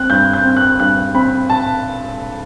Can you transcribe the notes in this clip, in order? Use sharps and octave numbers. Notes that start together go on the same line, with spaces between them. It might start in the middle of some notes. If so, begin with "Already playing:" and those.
Already playing: C4 F#6
G2 G6
G6
C4
F#6
G2 F#6
C4 B5
A5